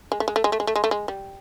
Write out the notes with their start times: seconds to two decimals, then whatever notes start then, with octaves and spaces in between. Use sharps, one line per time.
0.12 G#3
0.20 A3
0.28 G#3
0.36 A3
0.44 G#3
0.52 A3
0.60 G#3
0.67 A3
0.76 G#3
0.84 A3
0.91 G#3
1.08 G3